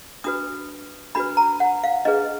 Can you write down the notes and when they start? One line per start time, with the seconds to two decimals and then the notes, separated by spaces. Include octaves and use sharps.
0.24 D4 F#4 B4 D#6
1.15 D4 F#4 B4 B5
1.37 A#5
1.60 F#5
1.84 F5
2.05 D4 G#4 B4 D#5